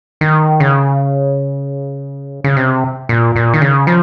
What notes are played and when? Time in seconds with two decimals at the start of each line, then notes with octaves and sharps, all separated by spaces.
0.21 D#3
0.60 C#3
2.44 C#3
2.57 C3
3.09 A#2
3.36 A#2
3.54 D#3
3.61 C#3
3.87 F3